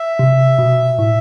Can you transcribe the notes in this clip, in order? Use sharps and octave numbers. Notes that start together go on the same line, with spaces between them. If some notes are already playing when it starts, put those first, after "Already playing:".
Already playing: E5
C3
B2
A2